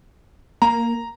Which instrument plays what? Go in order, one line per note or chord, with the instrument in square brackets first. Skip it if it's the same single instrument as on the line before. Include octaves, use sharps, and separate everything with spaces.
[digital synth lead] A#3 [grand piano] A#5